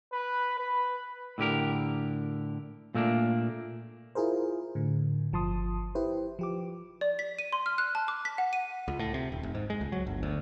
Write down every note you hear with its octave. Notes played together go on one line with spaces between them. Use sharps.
B4
B4
A2 D3 G4 A#4
A#2 A3 A#3 D4
E4 F4 G#4 A#4 C5
A2 D3
G1 F3 A5 C6 D#6
E4 G4 B4 C5
F3 G4 D6
D5
B6
D#7
C6
F6
F#6
A5
D6
B6
F#5
D#7
C#2
A2
C3
D#1
F1
G#2
G#3
C#2
F#3
G1
D2